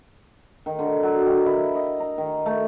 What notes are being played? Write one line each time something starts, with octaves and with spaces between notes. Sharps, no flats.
D#3
D3
F#3
D#3
E4
D#5
A#5
D#3
A3